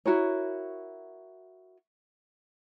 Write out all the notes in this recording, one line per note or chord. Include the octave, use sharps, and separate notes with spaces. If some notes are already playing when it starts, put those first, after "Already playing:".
E4 F#4 A#4 C#5